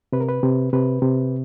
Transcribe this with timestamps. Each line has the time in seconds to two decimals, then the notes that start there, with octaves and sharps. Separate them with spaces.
0.12 C3 B4
0.21 A#4
0.29 B4
0.43 C3
0.73 C3 B4
1.02 C3